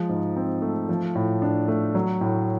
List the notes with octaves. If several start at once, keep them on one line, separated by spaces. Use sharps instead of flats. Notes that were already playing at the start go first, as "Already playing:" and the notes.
Already playing: F3 G#3
G#2
C4
A3
F3
A2
D4
A3
F#3
A2